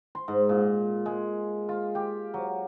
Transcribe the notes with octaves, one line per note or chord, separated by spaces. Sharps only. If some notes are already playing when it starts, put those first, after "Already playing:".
C6
G#2
A#2
G#3
F4
G4
F#3